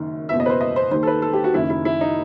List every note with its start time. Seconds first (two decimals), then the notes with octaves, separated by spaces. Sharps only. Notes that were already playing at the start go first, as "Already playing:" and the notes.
Already playing: F#1 F#2 D#3
0.29 F#1 E2 B2 E5
0.40 D#5
0.46 B4
0.50 C5
0.61 D#5
0.76 C5
0.91 D#2 D#3 C5
1.03 A4
1.07 B4
1.22 A4
1.33 G4
1.44 F#4
1.53 F#1 F#2 D#3 E4
1.70 E4
1.85 E4
2.01 D#4